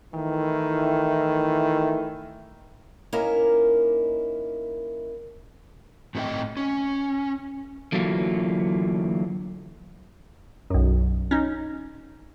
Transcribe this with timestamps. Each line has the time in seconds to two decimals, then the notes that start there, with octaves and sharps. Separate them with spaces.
0.14 D#3 E3 A3 E4
3.13 A#3 C#4 D#4 E4 A#4 D#5
6.15 A2 C4 F#4 B4 D#5 G5
6.57 C#4
7.92 D3 E3 F#3 A3 A#3 F4
10.70 B1 F#2
11.31 C#4 D#4